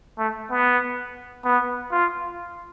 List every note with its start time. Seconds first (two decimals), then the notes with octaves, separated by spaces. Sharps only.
0.18 A3
0.50 B3
1.44 B3
1.91 F4